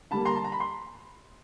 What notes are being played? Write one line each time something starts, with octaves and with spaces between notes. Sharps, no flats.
D3 G3 A#3 A5 B5
A#5 C6
A5
A#5
B5
C6